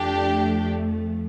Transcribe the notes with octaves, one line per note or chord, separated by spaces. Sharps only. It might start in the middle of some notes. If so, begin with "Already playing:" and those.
Already playing: F2 F3 A3 D4 G4